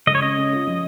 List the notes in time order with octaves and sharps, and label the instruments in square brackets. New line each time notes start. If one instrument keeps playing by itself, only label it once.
[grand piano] C#2 [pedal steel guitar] D#5
[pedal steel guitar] C#5
[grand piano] C#4 [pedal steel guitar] D#5
[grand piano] C#4
F4
F3